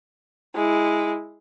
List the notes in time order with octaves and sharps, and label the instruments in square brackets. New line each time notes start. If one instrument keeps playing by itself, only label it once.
[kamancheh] G#3 E4